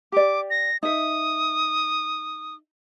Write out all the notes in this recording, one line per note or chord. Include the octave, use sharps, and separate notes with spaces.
G4 D5 D6
A#6
D#4 E5 D#6